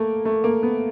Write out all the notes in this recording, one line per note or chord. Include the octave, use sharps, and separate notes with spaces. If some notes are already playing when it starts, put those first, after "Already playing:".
Already playing: A3 A#3
A3
A#3
B3